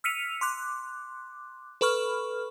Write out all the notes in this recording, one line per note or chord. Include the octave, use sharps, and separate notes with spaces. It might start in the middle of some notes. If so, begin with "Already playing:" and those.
E6 F6 B6 C#7 D#7 F7
C6 D6 F#6
A4 B4 B5 C#6 F6